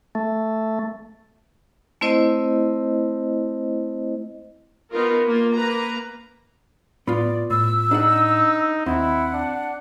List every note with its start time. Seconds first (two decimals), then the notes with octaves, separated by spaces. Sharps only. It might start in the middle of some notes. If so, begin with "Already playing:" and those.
0.15 A3
2.01 A3 C4 E4 C5 D#5
4.92 B3 D#4 F4 A#4
5.26 A#3 F4
5.55 A#3 B4 A#5
7.07 A2 B3 F4 D5
7.51 A2 E6
7.91 D4 D#4 G#4 F#5
8.86 D#2 C4 E4 F#5
9.33 D4